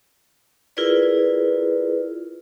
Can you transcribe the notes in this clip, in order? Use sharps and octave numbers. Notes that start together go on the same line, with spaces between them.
E4 F4 G#4 A#4 B4 D5